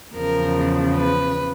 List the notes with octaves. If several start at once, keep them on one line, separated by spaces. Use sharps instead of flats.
E2 C#3 F3 A#4
B4